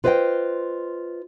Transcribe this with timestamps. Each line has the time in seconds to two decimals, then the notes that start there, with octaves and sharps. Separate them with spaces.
0.04 F4 B4 C5 D5 D#5 G5